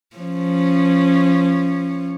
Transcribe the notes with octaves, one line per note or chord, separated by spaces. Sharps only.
F3 C#4